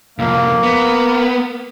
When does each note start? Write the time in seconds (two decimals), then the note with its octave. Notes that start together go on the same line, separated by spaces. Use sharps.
0.19 C2 F2 A#3
0.63 B3